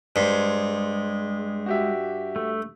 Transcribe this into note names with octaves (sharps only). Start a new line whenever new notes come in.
G2 G#3 C5
F#4 G4 E5
A3